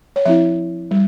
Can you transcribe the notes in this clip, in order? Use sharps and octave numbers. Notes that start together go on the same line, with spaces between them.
C#5
F3 C4 E4 E5
G3